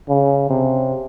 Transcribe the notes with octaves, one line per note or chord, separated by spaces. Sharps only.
C#3
C3